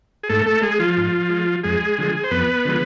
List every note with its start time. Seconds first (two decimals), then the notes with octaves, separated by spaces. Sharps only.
0.23 G#4
0.29 G#2 A3 A4
0.46 A3 A4
0.62 G#3 G#4
0.80 F3 F4
0.97 G#2
1.30 G#3
1.63 F2 G#3 G#4
1.98 D3 F3 G#3
2.24 C5
2.31 F2 B3 B4
2.65 D3 F3 G#3